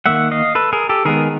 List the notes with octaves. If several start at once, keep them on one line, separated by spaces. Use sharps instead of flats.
D#3 G3 A#3 E5 F#5
D#5 F5
A4 B4
G#4 A#4
G4 A4
D#3 G#3 B3 G#4 A#4